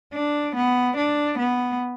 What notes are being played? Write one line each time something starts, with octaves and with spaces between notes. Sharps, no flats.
D4
B3
D4
B3